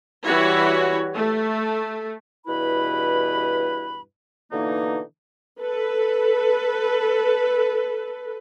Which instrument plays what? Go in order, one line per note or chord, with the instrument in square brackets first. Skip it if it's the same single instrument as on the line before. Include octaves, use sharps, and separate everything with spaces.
[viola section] E3 G3 E4 F#4 C#5
A3
[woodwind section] E2 G2 B2 E4 B4 B5
B2 D3 E3 A#3 D#4
[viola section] A4 B4